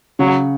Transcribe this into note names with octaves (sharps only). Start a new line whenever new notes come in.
C#3 F#3